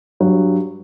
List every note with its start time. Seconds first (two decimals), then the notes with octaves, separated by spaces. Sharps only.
0.20 G2 F#3